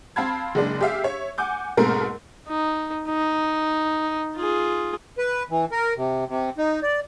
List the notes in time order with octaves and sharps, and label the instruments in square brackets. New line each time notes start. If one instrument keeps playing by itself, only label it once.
[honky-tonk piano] C4 F5 A5 B5 G#6
F#1 G#3 D4
G4 G#4 E5 F5
C#5 E5
F#5 G#5 D6 G6
G#2 B2 A3 A#3 C4 A#4
[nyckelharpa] D#4
D#4
F4 G#4
[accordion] B4
E3
A#4
C3
C3
D#4
D5